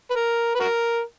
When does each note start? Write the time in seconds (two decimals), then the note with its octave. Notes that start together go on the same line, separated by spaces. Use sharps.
0.10 B4
0.16 A#4
0.55 B4
0.60 F#4 A#4